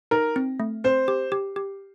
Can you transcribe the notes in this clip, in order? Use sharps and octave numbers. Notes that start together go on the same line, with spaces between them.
D#4 A#4
C4
A3
C4 C5
G4
G4
G4